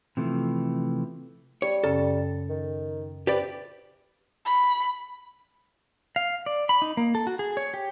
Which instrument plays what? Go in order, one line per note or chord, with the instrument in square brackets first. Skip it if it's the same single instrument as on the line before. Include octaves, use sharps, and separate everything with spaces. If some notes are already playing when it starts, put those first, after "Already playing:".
[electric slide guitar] C3 E3 F3 A3
[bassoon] G3 [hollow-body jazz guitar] C#5
[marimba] F#2 C#3 C#4 [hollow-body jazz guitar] A4
[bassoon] D#3
[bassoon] C3 [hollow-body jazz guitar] G4 B4 D5
[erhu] B5
[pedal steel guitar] F5
D5
B5
D#4
A#3
A4
F#4
G#4
C#5
G4